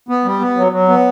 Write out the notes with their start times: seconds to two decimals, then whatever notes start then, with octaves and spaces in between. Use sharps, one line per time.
0.09 B3
0.25 G3
0.40 B3
0.57 F#3
0.72 F#3
0.88 B3